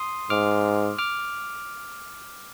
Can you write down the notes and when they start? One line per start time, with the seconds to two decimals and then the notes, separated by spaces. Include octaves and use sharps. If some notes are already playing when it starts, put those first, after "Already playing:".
Already playing: C6 D#6
0.30 G#2 D6 F6
0.99 D6 F6